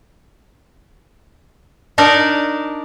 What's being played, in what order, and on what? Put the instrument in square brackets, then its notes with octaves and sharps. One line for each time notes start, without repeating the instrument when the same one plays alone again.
[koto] D4 D#4 A#4 D5